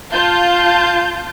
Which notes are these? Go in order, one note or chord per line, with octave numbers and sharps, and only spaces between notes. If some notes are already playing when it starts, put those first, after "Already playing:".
F4 A5 G6